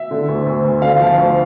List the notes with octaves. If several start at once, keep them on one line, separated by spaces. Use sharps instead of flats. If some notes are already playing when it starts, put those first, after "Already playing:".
Already playing: E5
D3
D2
D2
D2
D3 F5
F3
D2